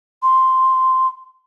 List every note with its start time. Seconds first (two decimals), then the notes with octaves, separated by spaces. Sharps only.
0.23 C6